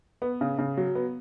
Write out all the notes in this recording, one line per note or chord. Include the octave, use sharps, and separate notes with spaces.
B3
C#3
C#3
F#3
B3